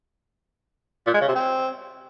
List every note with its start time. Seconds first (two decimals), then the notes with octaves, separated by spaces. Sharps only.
1.07 A#2
1.14 G#3
1.21 C#3
1.28 C3
1.35 C4